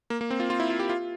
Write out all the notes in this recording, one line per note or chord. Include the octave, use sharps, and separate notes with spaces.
A#3
A#3
C4
F4
F4
E4
F4
G4
F4